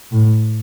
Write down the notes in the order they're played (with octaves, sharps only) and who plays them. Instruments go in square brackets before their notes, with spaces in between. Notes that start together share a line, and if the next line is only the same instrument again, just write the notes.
[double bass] A2